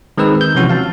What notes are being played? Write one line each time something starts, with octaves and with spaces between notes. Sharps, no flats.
D#3 G#3 C4 B4 E6
G6
C3 E3 F3 C4 C#4 F#4
F5 A5